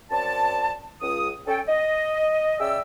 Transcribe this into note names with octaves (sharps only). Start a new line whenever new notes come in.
F#2 C4 D5 A5
C#2 D#6
C#4 A4 G5
D#5
C#3 G#4 D5 E5 G5 E6